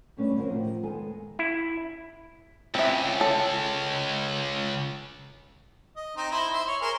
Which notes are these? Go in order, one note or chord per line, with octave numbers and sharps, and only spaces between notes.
G2 A3 C#4 D4 B4
D3 F3 C4 F#4 A#4
A2 C3 D#3 F3
D#3 G#3 B3 A4 G#5
E4
C#2 C4 E5
C#4 A4
D#5
C4 D#4 C5
E4 C5
C5 E5 C6
C#5
G#4 A#4 C5